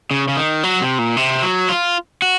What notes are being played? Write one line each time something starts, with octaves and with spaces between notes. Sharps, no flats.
C#3
C#3
D#3
F#3
C3
A#2
C3
F#3
F4
F#4